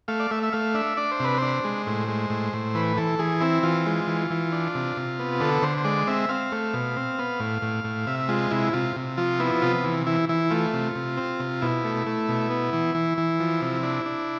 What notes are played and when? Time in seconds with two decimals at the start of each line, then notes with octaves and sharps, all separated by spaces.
0.08 A3 F5
0.20 D5
0.31 A3 E5
0.43 E5
0.52 A3 F5
0.75 D4 E5
0.97 D4 D5
1.12 C5
1.20 C3 B4
1.38 D4 C5
1.64 G#3
1.87 A2
2.08 G#3
2.30 A2
2.53 A2
2.75 E3 B4
2.97 E3 A4
3.19 E3 G#4
3.41 C4 E4
3.63 E3 F4
3.86 G#3
4.07 E3
4.31 E3
4.52 D4
4.75 C3
4.96 C3
5.19 B3
5.40 D3 A4
5.62 D3 C5
5.78 C5
5.85 G#3 D5
6.07 C4 E5
6.29 C4 F5
6.52 A3
6.73 B2
6.96 C4
7.19 B3
7.40 A2
7.62 A2
7.84 A2
8.07 C3 E5
8.29 G#3 F4
8.51 C3 E4
8.73 C3 F4
8.96 C3
9.17 F3 F4
9.40 B3 E4
9.62 C3 F4
9.84 E3
10.07 E3 E4
10.29 E3 E4
10.50 A3 F4
10.73 C3
10.95 C3
11.17 C4
11.40 C3
11.61 B2 E4
11.85 A3
12.07 A3
12.28 B2
12.50 B3
12.73 E3
12.95 E3
13.18 E3
13.40 F3
13.62 C3
13.83 D4
14.06 D4